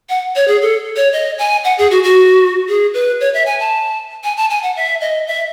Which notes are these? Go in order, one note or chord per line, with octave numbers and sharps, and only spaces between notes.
F#5
C#5
G#4
A4
C#5
D#5
G#5
F#5
G#4
F#4
F#4
G#4
B4
C#5
E5
G#5
A5
G#5
A5
G#5
F#5
E5
D#5
E5